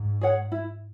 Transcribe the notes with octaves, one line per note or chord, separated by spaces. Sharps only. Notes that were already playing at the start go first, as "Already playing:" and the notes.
Already playing: G#2
G#4 C#5 F#5
E4